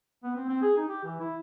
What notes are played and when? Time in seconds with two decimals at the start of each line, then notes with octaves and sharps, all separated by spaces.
0.24 B3
0.36 C4
0.49 C4
0.62 G#4
0.77 D#4
0.88 G4
1.04 E3
1.20 E4